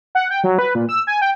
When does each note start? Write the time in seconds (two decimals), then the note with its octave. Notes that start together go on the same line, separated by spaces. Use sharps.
0.15 F#5
0.30 G5
0.44 F#3
0.59 B4
0.75 A#2
0.89 E6
1.07 G#5
1.22 G5